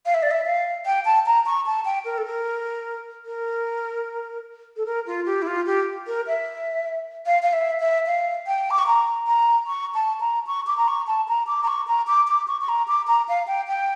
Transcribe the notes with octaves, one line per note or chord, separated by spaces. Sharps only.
F5
E5
D5
E5
F5
G5
A5
A#5
C#6
A5
G5
A#4
A4
A#4
A#4
A4
A#4
F4
G4
E4
F4
G4
A#4
E5
F5
F5
E5
E5
F5
G5
D6
C#6
A#5
A#5
C#6
A5
A#5
C#6
D6
A#5
C#6
A5
A#5
D6
A#5
C#6
A#5
D6
D6
C#6
C#6
A#5
D6
A#5
F5
G5
G5